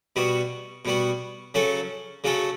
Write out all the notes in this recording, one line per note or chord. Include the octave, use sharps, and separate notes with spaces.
B2 G3 B3 F#4
B2 G3 B3 F#4
C#3 F#3 C#4 F#4 A4
C#3 F#3 C#4 F#4 A4